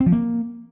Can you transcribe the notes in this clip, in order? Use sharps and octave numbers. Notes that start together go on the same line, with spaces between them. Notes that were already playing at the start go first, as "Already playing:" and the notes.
C4
F3
A#3